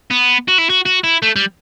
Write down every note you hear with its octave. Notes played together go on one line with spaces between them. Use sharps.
B3
F#4
E4
F#4
F#4
E4
A3
G3